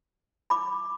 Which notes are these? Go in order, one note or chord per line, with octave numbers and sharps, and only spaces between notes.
B5 D6